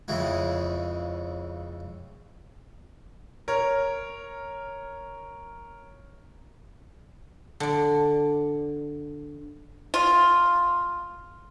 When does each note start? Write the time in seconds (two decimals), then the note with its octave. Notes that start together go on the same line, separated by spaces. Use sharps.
0.08 F2 C#3 G#3 E4
3.48 A#4 C#5
7.60 D3 D5
9.94 F4